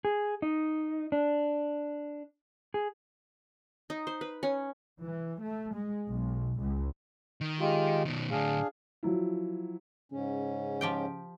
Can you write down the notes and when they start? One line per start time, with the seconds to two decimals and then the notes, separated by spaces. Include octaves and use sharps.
0.05 G#4
0.42 D#4
1.12 D4
2.74 G#4
3.90 D#4
4.07 C5
4.21 B4
4.43 C#4
5.03 E3
5.42 A3
5.74 G#3
6.08 B1
6.60 C#2
7.41 D#3
7.60 G#3 F4 G4
8.05 B2 D#3
8.31 A2 D3 D4 G#4 F5
9.03 F3 F#3 E4
10.12 G#2 C#3 C#4
10.81 F3 G4 G5